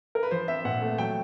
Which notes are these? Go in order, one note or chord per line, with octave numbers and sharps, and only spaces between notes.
A#4
B4
F3 C5
C4 E5
A#2 F#5
A3
F#3 G5